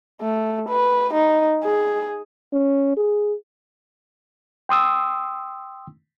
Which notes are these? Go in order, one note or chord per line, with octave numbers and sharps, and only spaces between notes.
A3
B4
D#4
G#4
C#4
G#4
G5 C6 D#6 E6